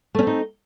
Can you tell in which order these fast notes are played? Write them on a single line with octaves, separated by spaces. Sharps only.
A3 C#4 C4 D#4